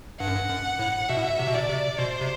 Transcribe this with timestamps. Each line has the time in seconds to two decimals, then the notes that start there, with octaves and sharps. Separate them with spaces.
0.20 G2 F#5
0.27 F#2
0.35 G2
0.49 F#2
0.79 A2
1.09 B2 E5
1.17 A2
1.24 B2
1.39 C3
1.48 B2
1.54 C3 D5
1.69 C3
1.99 B2 C5
2.21 C3